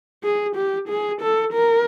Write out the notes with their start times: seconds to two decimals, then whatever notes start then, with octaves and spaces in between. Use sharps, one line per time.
0.23 G#4
0.55 G4
0.89 G#4
1.21 A4
1.54 A#4